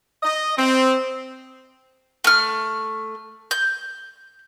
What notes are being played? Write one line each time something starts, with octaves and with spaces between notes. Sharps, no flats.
D#5
C4
A3 F6
G6